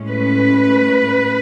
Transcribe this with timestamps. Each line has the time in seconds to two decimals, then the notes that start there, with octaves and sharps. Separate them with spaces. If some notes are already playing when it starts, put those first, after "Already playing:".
Already playing: A2 G#3 C#4
0.10 B4